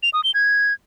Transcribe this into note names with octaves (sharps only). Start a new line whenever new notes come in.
F7
D#6
G7
G#6